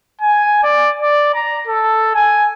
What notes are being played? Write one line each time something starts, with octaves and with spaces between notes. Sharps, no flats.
G#5
D5
D5
A#5
A4
G#5